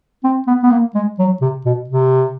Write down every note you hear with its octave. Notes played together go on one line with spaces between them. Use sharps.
C4
B3
B3
A#3
G#3
F#3
C3
B2
C3